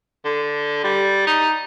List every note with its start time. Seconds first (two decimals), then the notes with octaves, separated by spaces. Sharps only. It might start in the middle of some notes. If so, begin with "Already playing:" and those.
0.25 D3
0.84 G3
1.27 D#4